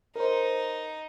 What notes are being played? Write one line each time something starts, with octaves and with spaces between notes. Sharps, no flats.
D#4 A#4 C5